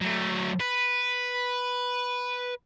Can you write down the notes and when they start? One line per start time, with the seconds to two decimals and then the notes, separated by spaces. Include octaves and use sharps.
0.01 F#3 A3
0.60 B4